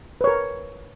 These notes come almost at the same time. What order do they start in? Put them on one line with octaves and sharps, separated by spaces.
B4 C#5 A#4